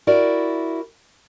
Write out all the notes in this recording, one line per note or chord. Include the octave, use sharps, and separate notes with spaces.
E4 F#4 A#4 D5